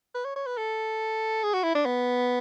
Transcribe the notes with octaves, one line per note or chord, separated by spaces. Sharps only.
B4
C#5
C#5
B4
A4
G#4
F#4
E4
D4
B3